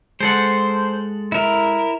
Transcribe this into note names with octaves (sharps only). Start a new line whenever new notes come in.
G#3 A4 C5 F#5
E4 A#4